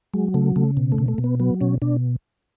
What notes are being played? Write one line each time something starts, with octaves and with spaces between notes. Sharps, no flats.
F#3 G#3
C#3 A3
C#3 A3
B2
A3
B2
A3
B2
B3
F#3 B3
B2 C#4
B2 D4